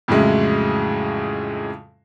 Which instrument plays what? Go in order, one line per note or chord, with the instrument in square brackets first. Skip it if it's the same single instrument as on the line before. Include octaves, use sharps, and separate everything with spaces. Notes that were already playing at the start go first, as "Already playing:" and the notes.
[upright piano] F2 A2 C#3 F#3 G#3 E4